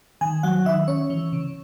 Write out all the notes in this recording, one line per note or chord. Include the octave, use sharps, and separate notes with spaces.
D#3 G#5
F#3 F#5
D#3 E5
C#4 C#5
E3
C#3